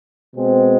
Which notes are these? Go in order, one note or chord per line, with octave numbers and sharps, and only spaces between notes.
B2 G#3 C4